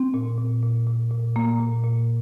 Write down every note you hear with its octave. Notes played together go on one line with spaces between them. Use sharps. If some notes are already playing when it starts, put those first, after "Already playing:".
Already playing: C4
A#2
A#2
A#2
A#2
A#2
A#2 A#3
A#2
A#2